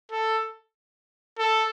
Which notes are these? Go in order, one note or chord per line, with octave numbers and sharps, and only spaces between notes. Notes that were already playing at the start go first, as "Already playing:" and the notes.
A4
A4